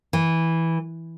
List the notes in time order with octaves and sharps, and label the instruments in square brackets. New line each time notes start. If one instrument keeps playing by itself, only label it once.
[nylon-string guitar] E3